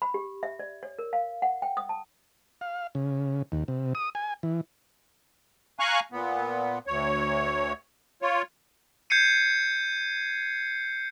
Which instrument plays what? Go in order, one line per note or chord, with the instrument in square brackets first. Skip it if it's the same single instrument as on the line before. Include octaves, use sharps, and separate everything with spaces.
[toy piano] B5
G4
E5
D5
C#5
A#4
F5
F#5
G5
D#6
A5
[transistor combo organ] F5
C#3
D#2
C3
D#6
G#5
E3
[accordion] F5 G#5 A#5 C#6 F#6
A#2 B3
D2 C#5
F4 C#5
[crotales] G6 G#6 C7 C#7 D#7